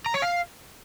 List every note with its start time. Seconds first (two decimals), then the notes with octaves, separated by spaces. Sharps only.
0.06 A#5
0.14 C#5
0.22 F5